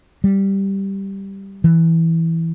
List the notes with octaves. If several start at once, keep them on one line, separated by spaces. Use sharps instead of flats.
G3
E3